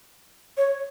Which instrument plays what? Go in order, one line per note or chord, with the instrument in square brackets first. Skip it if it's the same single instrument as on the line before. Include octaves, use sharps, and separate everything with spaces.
[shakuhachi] C#5